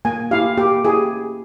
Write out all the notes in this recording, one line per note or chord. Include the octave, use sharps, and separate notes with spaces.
A#3 G#5
E4 G4 F5
A#3 G4
E4 G4 G#4